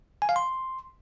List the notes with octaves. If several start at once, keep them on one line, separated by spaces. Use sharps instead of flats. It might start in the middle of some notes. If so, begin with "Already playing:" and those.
G#5
F5
C6